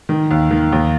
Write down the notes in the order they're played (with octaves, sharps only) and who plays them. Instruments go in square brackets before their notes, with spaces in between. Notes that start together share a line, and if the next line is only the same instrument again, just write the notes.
[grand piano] D#3
D#2
D#3
D#2